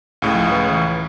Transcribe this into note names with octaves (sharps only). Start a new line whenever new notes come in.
C#2 A2 C#3
F3
B4
E3